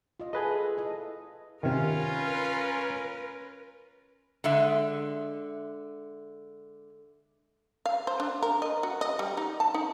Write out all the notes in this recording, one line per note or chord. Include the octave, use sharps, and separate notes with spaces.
F4 D#5
G#4 A4 B4 D#5
E4 A4 D#5
C3 D#3 C#4 F4 A#4 B4
D3 G#3 E5
F5
C5
D4
A#4
D#5
F#4
D#5
G3
D#4
A5
D#4